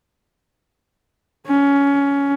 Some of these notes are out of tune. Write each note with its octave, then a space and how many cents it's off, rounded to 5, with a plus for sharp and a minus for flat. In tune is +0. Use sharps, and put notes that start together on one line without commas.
C#4 +20